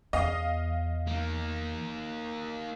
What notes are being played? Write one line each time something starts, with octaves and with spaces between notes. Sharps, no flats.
E2 D#5 F5
A#3 D#4